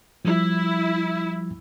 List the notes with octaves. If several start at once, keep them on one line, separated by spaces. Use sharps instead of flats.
F3 G3 E4